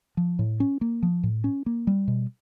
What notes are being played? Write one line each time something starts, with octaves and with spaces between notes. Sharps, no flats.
F3
A2
C#4
A#3
F3
A2
C#4
A#3
G3
B2